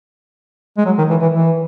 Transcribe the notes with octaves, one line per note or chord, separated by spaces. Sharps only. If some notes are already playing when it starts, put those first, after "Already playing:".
G#3
F#3
D#3
E3
E3
E3